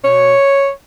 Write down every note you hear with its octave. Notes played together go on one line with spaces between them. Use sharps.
B2 C#5